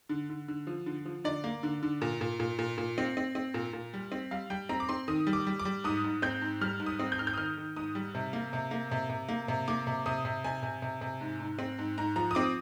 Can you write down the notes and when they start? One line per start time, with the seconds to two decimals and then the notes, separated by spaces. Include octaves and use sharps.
0.09 D3
0.30 D3
0.48 D3
0.67 F3
0.86 D3
1.05 F3
1.24 D3 D5
1.44 A#3
1.63 D3
1.83 D3
2.01 A#2
2.21 A#2
2.40 A#2
2.59 A#2
2.78 A#2
2.98 C4
3.17 C4
3.35 C4
3.54 A#2
3.73 A#2
3.94 G3
4.12 C4
4.31 G3 F5
4.50 G3 G5
4.69 C4 A#5
4.80 D6
4.89 C4 C6
5.08 D#3 D#6
5.27 G3
5.33 D6
5.47 G3
5.59 D6
5.65 G3
5.84 G#2 D#6
6.04 G#2
6.22 C4 G6
6.41 G#2
6.61 G3 F6
6.80 G#2
6.86 D#6
7.00 C4
7.12 G6
7.18 G#2 F6
7.27 G6
7.34 D#6
7.38 D#3 F6
7.57 D#3
7.77 G#2 D#6
7.95 G3
8.15 C3
8.33 A#3
8.53 C3
8.71 A#3
8.91 C3
9.09 C3
9.29 A#3
9.48 C3
9.68 A#3 D6
9.87 C3
10.06 C3 D#6
10.25 C3
10.44 C3 G#5
10.63 C3
10.82 C3
11.01 C3
11.21 G#2
11.40 G#2
11.59 C4
11.78 G#2
11.98 G#2 A#5
12.16 F3 A#5
12.31 D#6
12.35 C4 D6